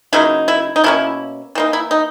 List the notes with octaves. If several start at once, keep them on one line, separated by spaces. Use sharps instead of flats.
C#3 F#3 A#3 D#4 E4
E4
D#4
B2 A#3 C#4 E4
E3 A#3 D#4
E4
D#4